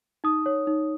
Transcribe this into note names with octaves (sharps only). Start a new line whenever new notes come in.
D#4 D#6
C#5
D#4